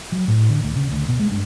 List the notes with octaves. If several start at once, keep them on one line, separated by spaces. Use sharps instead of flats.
F#3
A2
D3
D2
C#3
D2
B2
G#3
G2